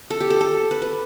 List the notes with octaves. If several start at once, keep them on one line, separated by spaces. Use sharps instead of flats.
A4
G4
A4
A4
B4
B4